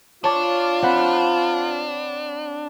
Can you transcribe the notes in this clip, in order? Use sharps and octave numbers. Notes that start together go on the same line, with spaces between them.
D4 F4 C#5 A5 D6
C4 F#5 B5